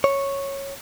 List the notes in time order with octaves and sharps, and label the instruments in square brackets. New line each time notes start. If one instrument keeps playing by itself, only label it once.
[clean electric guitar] C#5